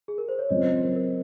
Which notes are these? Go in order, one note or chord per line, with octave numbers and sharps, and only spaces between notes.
G#4
A#4
C5
C#5
C#3 F#3 C4 F4 C5 D#5
C5 D#5
A#4
A#4